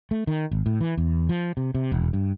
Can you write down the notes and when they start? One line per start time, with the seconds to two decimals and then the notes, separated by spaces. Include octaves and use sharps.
0.11 A3
0.27 D#3
0.51 G#1
0.66 A2
0.81 E3
0.97 E2
1.29 F3
1.57 C3
1.75 C3
1.92 E1
2.13 G2